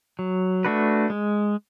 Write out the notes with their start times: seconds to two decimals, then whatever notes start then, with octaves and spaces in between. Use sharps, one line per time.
0.19 F#3
0.65 A3 D4 F#4 B4
1.10 G#3